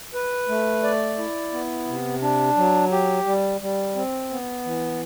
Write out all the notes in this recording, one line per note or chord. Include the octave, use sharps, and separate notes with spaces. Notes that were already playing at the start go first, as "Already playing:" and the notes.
B4
A3
D5
E4
B3
C3
D4
F#3
G4
G3
G3
C4
B3
E3